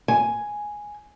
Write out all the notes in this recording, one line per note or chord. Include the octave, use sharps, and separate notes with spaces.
G#5